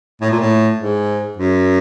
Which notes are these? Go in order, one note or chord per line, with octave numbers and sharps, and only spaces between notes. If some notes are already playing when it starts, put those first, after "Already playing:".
A2
A#2
A2
G#2
F#2